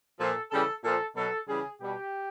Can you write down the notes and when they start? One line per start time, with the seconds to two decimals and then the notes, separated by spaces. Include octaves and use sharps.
0.20 A#2 F3 A4
0.51 C#3 E3 G3 A4
0.83 A#2 F3 A4
1.16 B2 F#3 A4
1.48 C#3 E3 G3 G#4
1.81 B2 G3 G4